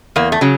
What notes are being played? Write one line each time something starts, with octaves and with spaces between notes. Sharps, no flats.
E2 A#3
A3
C#3 F#3